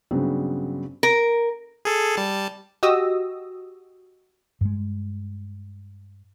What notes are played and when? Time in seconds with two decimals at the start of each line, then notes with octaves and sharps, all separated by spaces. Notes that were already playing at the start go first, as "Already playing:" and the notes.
0.11 G2 C#3 F#3 B3 C4 D4
1.03 A#4
1.85 G#4 A4
2.17 G3 A5
2.83 F#4 G4 D#5 D#6 E6 A#6
4.61 G2 G#3